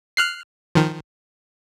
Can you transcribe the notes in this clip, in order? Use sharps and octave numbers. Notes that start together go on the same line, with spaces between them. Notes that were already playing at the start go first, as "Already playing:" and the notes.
F6 F#6 C7
D#3 F3